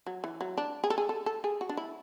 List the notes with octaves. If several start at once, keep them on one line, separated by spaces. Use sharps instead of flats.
F#3
E3
F#3
D4
G#4
A4
G#4
A4
A4
G#4
F#4
D4
E4